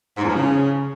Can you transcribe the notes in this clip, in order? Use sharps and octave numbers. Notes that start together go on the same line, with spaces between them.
G#2
E2
F3
C#3